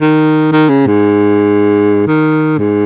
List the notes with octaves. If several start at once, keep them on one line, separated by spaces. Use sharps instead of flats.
D#3
D#3
C#3
G#2
D#3
G#2